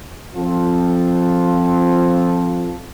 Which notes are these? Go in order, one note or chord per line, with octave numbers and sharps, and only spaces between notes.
F3 C4 F4 A4